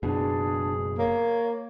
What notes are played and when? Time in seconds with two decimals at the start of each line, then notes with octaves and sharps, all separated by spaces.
0.03 F#1 B2 D4 G#4
0.98 A#3 C#5